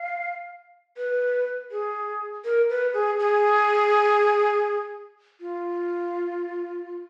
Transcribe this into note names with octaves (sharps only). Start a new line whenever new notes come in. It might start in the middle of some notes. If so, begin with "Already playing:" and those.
Already playing: F5
B4
G#4
A#4
B4
G#4
G#4
F4